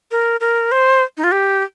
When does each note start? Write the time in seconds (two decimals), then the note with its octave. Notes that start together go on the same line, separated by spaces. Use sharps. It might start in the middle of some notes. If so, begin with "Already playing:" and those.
0.11 A#4
0.40 A#4
0.72 C5
1.17 D#4
1.24 F4
1.32 G4